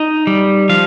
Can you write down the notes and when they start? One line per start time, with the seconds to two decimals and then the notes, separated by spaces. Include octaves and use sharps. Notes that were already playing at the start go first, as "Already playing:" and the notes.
Already playing: D#4
0.27 G3
0.69 F3 F5